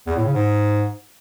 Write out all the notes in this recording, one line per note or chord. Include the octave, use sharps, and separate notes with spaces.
E2
A2
C#3
G#2